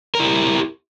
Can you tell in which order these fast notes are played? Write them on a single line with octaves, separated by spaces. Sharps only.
A#4 E4 G4